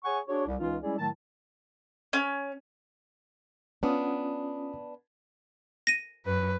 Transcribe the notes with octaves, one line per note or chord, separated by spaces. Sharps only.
G#4 C#5 F#5 G#5 C#6
D4 F#4 G#4 C#5
C2
C#2 E3 C#4 D#4 F4
G3 G#3 C#4 E4 G#4 D5
A2 D#3 F#3 A3 A5
C#4
B3 C#4 D4 F4 D#6
A#6 D#7
F#2 B4